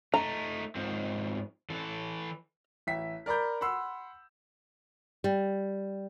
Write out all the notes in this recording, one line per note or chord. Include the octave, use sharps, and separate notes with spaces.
A3 D#4 A#5
G#2 F3 C4
E3 A4
A1 E5 G5 B6
A#4 D5 A#5 B5 G6
F#5 B5 C6 E6
G3